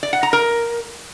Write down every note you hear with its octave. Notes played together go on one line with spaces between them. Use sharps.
D5
F#5
A#5
A#4